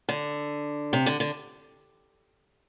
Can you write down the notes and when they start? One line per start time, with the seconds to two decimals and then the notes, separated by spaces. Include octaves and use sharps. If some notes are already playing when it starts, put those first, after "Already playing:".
0.09 D3
0.93 C3
1.06 D3
1.20 D3